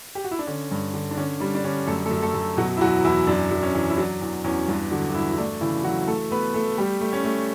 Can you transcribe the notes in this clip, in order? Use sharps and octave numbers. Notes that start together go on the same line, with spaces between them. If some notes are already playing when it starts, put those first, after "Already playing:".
G4
F#4
E4
D4
D3 C#4
G2
D3
D4
D3 C#4
G3 D4
D4
D3 C#4
F#2 A3 A4
A3 A4
F#2
A3 A4
F#2
B2 F#3 F#4
E4
E2 F#3 F#4
E2 E3 E4
F#2 D4
F#2
C#4
E3
E4
F#3 D4
E2
E2 C#4
G2 D4
D3 F#3 F#4
F#4
G2 E3 E4
E4
A3 D4
C#3 E3 E4
E3 F#3 F#4
A3 A4
A3 B3 B4
A3 A4
G3 A3 G4
A3
C#4
A3